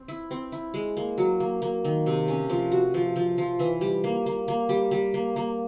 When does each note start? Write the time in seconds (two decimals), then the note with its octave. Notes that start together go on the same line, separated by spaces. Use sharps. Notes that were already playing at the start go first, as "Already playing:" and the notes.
Already playing: C4
0.08 E4
0.31 C4
0.52 E4
0.74 G#3
0.97 A#3
1.18 F#3
1.40 A#3
1.62 A#3
1.84 D#3
2.06 C3
2.28 C#4
2.50 F3
2.72 F#4
2.94 F3
3.16 F3
3.38 F3
3.59 E3
3.81 G3
4.04 A#3
4.26 A#3
4.48 A#3
4.69 G3
4.91 G3
5.14 A#3
5.36 A#3